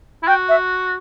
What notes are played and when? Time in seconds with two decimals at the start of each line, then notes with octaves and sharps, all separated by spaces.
0.23 E4
0.27 F#4 G5
0.49 E5